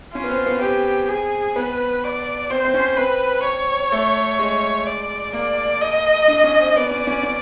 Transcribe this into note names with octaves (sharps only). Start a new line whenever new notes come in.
C#4 F4
B3
C4
B3
C4 G4
G#4
B3 B4
D5
C4 C5
C4
C#4
C4 B4
C#5
A3
G#3
D5
A#3 D5
D#5
D4
C#4
C4
B3 D5
C#4
C#4
C#4